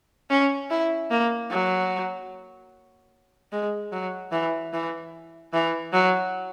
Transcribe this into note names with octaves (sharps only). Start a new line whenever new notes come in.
C#4
E4
A#3
F#3
G#3
F#3
E3
E3
E3
F#3